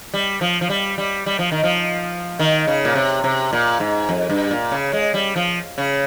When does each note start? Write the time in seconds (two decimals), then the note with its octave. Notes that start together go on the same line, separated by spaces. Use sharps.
0.14 G3
0.41 F3
0.61 F3
0.70 G3
0.98 G3
1.26 G3
1.39 F3
1.52 D#3
1.63 F3
2.40 D#3
2.67 C#3
2.85 A#2
2.95 C3
3.24 C3
3.53 A#2
3.80 G#2
4.09 F2
4.29 G2
4.51 A#2
4.72 C#3
4.93 G#3
5.14 G3
5.36 F3
5.78 C#3